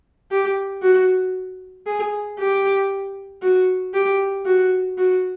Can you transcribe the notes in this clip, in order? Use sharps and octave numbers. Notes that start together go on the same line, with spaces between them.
G4
F#4
G#4
G4
F#4
G4
F#4
F#4